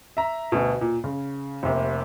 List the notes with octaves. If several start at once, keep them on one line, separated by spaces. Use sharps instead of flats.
E5 A#5
D2 B2
A#2
C#3
F1 C3 A#3